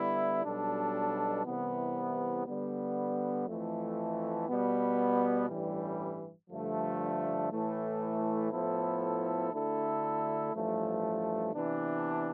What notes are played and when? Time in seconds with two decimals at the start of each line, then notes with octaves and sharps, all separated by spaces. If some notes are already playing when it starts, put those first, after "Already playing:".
Already playing: D3 G3 B3 E4
0.44 B1 B2 G3 D4 A4
1.45 C2 C3 E3 B3
2.47 D3 G3 B3
3.46 F2 E3 A3
4.48 B2 G3 B3
5.48 A1 G2 E3 G3
6.50 G2 D3 F3 A3
7.50 A2 E3 A3
8.52 A2 F3 B3 E4 A4
9.52 D2 D3 A3 E4 A4
10.53 A1 G2 F3 A3
11.53 C3 E3 B3 D4